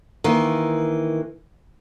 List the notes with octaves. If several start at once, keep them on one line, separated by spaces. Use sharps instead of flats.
D#3 E3 A#3